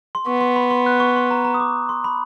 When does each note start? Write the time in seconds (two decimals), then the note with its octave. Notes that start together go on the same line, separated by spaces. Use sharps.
0.15 C6
0.26 B3 C#6
0.41 C6
0.56 B5
0.71 C6
0.86 F#6
1.00 C#6
1.16 C6
1.31 A#5
1.45 A#5
1.54 D#6
1.60 D6
1.89 C6
2.04 B5